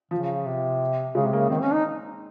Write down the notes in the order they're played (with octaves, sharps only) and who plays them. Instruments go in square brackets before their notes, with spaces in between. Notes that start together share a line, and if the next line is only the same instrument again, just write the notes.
[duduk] C#3 [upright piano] F3
[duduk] C3
[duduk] C#3 [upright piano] G#3
[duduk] C3
[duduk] C#3 [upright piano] A#3
[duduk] D#3 [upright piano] C4
[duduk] C#4
D#4